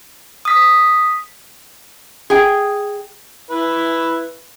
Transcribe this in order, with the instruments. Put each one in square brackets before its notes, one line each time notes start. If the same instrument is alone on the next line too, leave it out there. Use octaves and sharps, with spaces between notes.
[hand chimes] D#6 B6
[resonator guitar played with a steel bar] G#4 G5
[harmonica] E4 B4